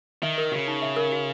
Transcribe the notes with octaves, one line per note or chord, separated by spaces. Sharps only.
D#3 E5
A#4
C#3 F#4
D#4
E5
A#4
F#4